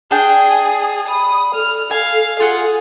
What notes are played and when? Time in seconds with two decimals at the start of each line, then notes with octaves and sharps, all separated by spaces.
0.11 D4 G#4 G5
1.08 B5 D#6
1.55 A4 F6
1.91 F5 G#5
2.40 F4 G#4 F#5